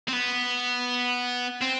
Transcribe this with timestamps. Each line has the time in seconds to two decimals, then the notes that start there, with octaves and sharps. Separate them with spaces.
0.08 C4
0.13 B3
1.61 C4